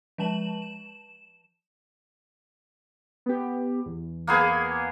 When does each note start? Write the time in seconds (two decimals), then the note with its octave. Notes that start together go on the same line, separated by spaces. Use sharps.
0.18 F3 G#3 A5 E7 F#7
0.62 E7
3.26 B3 G4
3.86 E2
4.27 A#3 B3 G#4